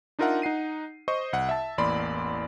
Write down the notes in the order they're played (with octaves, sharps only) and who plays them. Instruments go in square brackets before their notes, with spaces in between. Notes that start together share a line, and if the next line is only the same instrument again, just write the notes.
[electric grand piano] D4 D#4 F4 A#4 E5 F#5
D#4 F#5 C7 D#7
C5 D#5 C#6
C2 F#5
E5 A5
A1 E2 A#3 D5 B5 C6